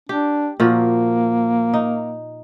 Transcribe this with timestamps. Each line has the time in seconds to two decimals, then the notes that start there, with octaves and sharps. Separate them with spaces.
0.09 D4 G4
0.60 A#2 F3 A#3 F#4
1.74 D#4